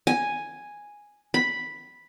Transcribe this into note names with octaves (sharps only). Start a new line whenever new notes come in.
G#5
B5